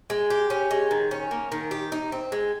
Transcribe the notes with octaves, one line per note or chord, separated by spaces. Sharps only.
G#3
G4
C#4
G#3
D#3
C#4
A#3
D#3
G4
D#4
C4
G#3